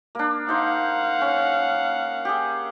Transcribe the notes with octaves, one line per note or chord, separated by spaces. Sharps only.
A#3 D4
D#4 C5 F5 F#5
C#4
G4 G#4